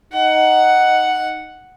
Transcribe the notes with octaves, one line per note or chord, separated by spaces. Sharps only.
D#4 F#5